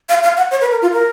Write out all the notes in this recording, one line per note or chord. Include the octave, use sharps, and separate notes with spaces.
F5
F5
F#5
C#5
B4
A#4
F4
A#4